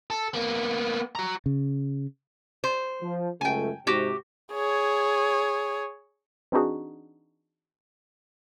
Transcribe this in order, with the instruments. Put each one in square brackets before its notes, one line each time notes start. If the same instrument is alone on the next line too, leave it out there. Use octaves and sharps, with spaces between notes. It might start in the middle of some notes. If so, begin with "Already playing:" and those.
[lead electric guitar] A4
A#3 B3
F#4 A#5
[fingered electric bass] C#3
[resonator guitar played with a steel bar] C5
[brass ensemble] F3
[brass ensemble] C#2 F#2 A3 [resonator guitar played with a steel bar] G5 G#5
[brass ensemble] G#2 C3 [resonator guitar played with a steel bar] F#4 G4
[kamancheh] G#4 C#5
[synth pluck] E3 C4 D4 D#4 F#4 G#4